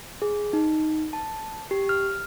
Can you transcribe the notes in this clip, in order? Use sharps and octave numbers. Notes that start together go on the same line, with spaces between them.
G#4
D#4
A5
G4
F6